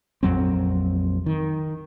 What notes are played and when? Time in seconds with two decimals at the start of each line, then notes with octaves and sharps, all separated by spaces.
0.23 A#1 F2 F#3 C4
1.26 D#3